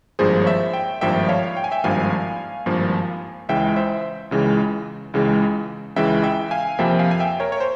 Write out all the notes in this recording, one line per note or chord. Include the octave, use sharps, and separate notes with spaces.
G#1 G2 F3 A#3 G#4 C5
C#5
C5 E5
E5 G5
G#1 G2 F3 A#3 E5 G5
C#5 F5
G5
G#5
E5 G5
G#1 G2 F3 A#3 F5 G#5
G#1 G2 F3 A#3
C#2 C#3 E3 G#3 E5 G5
C5 E5
C#2 C#3 E3 G#3
C#2 C#3 E3 G#3
C#2 C#3 E3 G#3 E5 G5
E5 G5
F5 G#5
F2 C3 F3 A#3 E5 G5
F5 G#5
G#5
E5 G5
A#4 C#5
C#5
C5